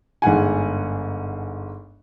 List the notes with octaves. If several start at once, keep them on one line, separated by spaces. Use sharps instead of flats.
G1 G#2 F#5 G#5